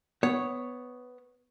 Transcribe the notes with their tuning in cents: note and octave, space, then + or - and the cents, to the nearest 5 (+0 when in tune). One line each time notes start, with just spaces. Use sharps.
B3 +10 C#5 +0